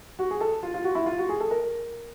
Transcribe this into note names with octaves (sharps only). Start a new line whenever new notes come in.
F#4
G#4
A4
F4
F4
F#4
E4
F4
F#4
G#4
A4
A#4